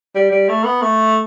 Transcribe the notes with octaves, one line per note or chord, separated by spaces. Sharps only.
G3
G3
A3
B3
A3